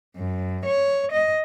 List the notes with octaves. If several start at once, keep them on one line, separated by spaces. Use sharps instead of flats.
F#2
C#5
D#5